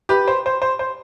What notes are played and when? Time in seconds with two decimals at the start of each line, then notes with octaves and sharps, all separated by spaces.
0.09 G4 B4
0.28 C5
0.46 C5
0.62 C5
0.79 C5